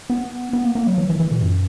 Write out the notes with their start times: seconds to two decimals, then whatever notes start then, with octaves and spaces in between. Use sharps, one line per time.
0.10 B3
0.53 B3
0.65 A#3
0.75 A#3
0.87 F#3
0.98 E3
1.10 E3
1.20 E3
1.31 A#2
1.42 F#2